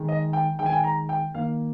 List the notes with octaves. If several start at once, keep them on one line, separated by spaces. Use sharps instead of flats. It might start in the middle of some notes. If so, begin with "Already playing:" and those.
Already playing: D#3 G#3
D#5
G5
D#3 G#3 G5
G#5
G5
A#5
G5
D#3 A#3 F5